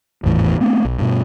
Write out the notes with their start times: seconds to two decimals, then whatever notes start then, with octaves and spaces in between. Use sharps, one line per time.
0.24 G#1 E2 A2 E3
0.60 A3 B3 C4 D4
0.85 B1
0.98 G2 B2